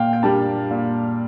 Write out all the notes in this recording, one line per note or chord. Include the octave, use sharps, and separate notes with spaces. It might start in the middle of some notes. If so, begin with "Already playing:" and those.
Already playing: A#2 F5 G5
G5
G3 A#3 D4 A5
A#2